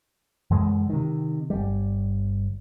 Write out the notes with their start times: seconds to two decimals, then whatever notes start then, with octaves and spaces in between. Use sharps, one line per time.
0.51 F#2 D3 E3 G#3
0.90 C3 D#3
1.50 G1 G3